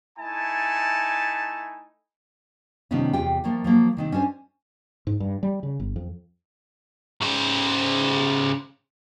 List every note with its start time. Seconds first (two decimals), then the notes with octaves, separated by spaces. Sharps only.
0.19 A3 D#4 E4 G#5 A5
2.91 C3 D#3 F3 G3 B3 C#4
3.13 E2 C3 F4 G4 G5
3.44 F3 A3 A#3
3.64 F3 F#3 A#3
3.97 C3 D#3 C4
4.12 C#4 D4 A4 C5 G#5
5.07 G#2
5.20 G2
5.43 G3
5.63 C#3
5.80 G1
5.96 F2
7.22 C#3 C5